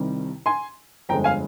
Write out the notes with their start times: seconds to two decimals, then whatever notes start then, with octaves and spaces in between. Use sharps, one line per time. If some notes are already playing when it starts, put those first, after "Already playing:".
Already playing: C2 C3 D#3 G3
0.46 G#5 C6
1.09 G1 F2 D3 G#3 G5 A#5
1.24 F5 G#5